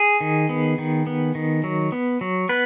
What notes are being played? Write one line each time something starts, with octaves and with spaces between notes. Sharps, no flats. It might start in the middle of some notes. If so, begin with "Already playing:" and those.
Already playing: G#4
D#3
B3
D#3
B3
D#3
F#3
B3
F#3
B3 B4